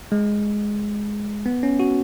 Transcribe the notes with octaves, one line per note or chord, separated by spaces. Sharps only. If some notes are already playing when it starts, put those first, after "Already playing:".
G#3
B3
C#4
F#4